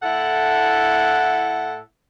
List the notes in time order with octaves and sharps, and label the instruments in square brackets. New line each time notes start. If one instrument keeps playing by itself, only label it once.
[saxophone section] A2 E4 A4 F#5